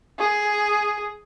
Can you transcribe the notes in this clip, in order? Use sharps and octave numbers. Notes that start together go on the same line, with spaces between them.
G#4